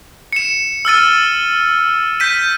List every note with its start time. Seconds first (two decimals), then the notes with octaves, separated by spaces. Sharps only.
0.33 C#7 E7
0.85 E6 F6 A6 D#7
2.20 G6 B6 D#7